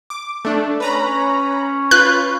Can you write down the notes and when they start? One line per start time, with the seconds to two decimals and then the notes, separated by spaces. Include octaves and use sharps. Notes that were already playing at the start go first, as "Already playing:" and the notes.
0.10 D6
0.45 A3 D4
0.80 C#4 B4 A#5 B5
1.91 F4 B4 F#6